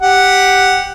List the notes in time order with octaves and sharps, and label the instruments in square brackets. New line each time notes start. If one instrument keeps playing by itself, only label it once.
[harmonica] G4 F#5